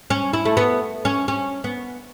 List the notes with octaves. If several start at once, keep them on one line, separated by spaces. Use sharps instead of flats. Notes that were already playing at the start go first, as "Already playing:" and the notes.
C#4
E4
A3
B3
C#4
C#4
B3